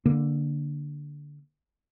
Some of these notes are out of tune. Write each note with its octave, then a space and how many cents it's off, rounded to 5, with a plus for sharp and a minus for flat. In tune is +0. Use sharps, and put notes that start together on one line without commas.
D3 +0 A#3 +0